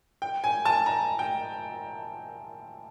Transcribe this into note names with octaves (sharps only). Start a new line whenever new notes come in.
G5
G#5
A5
A#5
G5